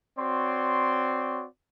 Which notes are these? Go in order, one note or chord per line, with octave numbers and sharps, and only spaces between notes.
C4 F#4 C#5 D5 C6